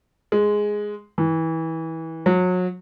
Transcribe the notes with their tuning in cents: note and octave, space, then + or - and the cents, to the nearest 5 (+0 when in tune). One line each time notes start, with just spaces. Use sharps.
G#3 +0
E3 -25
F#3 -30